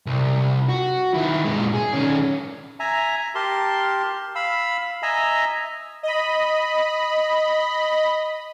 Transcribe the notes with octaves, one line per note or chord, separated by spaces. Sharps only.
C2
F#4
D#3 E4
A#2 G#3
G#4
D#3 C#4
E5 G#5 A#5
G4 A#4 A5 C6
F5 B5 E6
D#5 E5 G#5 A#5 E6
D#5 B5